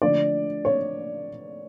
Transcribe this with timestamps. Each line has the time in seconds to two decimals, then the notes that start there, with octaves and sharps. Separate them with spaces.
0.02 D3 F3 A3 D5
0.65 C#5